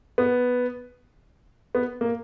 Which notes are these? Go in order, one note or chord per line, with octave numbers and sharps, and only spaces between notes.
B3
B3
A#3